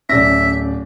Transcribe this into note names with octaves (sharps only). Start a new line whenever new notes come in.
D1 C#4 D5 E5 A#6